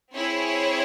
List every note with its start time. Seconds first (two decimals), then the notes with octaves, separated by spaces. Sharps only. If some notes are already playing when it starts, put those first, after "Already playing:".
0.14 C4 E4 G#4 C#5